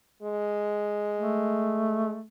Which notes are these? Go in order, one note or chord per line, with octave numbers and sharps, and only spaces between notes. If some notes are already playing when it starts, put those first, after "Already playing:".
G#3
A3